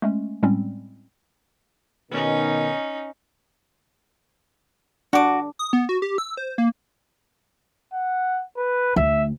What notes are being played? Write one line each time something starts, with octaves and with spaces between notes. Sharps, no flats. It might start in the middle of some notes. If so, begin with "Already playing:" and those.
G#3 A3 C#4
A2 G3 G#3 C4 C#4
B2 D#3 C#4 D#4
D4 F#4 D6
D#6
B3
F#4
G4
E6
C5
A#3
F#5
B4
D2 E5